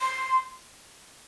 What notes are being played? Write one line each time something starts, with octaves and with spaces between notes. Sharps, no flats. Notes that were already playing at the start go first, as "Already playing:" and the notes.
C6